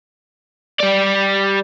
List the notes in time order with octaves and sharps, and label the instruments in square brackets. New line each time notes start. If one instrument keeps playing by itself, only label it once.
[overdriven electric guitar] G3 D5